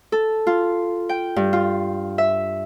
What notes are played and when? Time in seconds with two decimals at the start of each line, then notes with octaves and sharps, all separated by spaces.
0.12 A4
0.47 F4
1.09 G5
1.36 G2
1.53 F4
2.18 E5